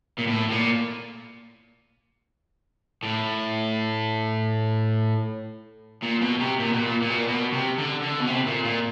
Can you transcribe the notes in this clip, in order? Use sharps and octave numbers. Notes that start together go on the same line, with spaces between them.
A#2
A2
A2
A#2
A2
A#2
B2
C3
A#2
B2
A#2
A#2
B2
A#2
B2
C3
D3
D3
B2
C3
A#2
A#2